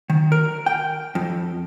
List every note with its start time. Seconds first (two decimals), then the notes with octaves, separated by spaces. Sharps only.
0.10 D#3
0.32 A#4
0.66 G5
1.15 F2